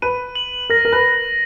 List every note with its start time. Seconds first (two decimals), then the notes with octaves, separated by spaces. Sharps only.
0.02 B4 D#7
0.35 F#7
0.70 A#4 A#6
0.85 A#4
0.92 B4